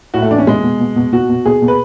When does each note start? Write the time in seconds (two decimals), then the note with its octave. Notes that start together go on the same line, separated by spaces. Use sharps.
0.14 A2 F#4
0.22 A3
0.31 E3 D4
0.38 C#4
0.46 B2 G#3
0.63 B2
0.80 B2
0.96 B2
1.13 B2 F#4
1.29 B2
1.45 B2 G#4
1.62 B2
1.68 B4